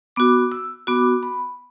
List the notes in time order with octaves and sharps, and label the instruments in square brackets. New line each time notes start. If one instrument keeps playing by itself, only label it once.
[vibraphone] B3 F#4 D6
E6
B3 F#4 D6
B5